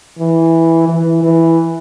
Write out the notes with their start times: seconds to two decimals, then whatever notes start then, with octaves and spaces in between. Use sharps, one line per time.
0.19 E3
0.88 E3
1.23 E3